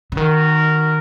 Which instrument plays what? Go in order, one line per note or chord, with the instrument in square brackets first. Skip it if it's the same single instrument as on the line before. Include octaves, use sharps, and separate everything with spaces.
[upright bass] C#3
[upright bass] D#3 [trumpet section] F#4 A#4